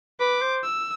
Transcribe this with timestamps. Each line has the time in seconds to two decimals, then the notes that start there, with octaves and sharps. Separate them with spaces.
0.20 B4 D6
0.42 C5
0.63 E6